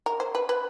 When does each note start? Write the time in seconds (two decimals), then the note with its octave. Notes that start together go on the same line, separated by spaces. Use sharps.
0.06 A#4
0.20 C5
0.35 B4
0.49 B4